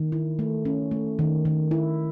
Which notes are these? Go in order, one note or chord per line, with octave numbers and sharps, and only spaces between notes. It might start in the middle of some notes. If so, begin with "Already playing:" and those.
Already playing: D#3
E4
A3
C#4
A3
D#3
D#3
E4